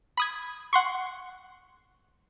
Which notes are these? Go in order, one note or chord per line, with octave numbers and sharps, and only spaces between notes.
B5 D#6 G#6
F#5 C6 C#6